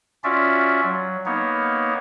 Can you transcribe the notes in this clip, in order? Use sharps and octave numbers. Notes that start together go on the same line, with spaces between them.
C#4 F4 F#4 D5 E5
F#3
A#3 B3 D#4 C#5